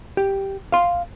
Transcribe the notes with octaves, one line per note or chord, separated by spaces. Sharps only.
G4
F5 C6